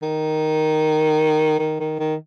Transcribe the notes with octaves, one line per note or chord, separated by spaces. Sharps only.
D#3
D#3
D#3
D#3